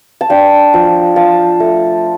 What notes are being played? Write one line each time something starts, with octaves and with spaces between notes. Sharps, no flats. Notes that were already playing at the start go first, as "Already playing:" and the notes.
A5
D4 G5
F3
F4 A5
A3